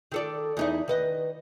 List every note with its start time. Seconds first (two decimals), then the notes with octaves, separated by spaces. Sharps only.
0.12 D#3 A4 D5
0.57 E2 D#4 E4
0.88 D#3 B4 D#5